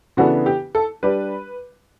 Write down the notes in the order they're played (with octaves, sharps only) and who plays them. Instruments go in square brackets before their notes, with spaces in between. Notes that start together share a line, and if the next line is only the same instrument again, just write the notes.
[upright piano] C#3 E3 B3 D4 A4 [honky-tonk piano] F#4
[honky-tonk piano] G4
A4
[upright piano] G3 D4 G4 [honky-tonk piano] B4